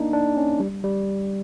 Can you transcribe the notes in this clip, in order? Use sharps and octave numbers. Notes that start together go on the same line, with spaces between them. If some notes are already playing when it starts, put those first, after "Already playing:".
Already playing: A#3 D4 D#4
D4
C#4
G3
G3